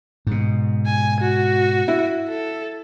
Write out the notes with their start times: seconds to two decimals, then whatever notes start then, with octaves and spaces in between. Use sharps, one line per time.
0.27 G#2 B2
0.86 G#5
1.21 F#4
1.88 E4
2.29 A4